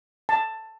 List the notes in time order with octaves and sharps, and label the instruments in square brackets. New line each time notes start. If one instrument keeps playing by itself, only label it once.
[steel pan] A5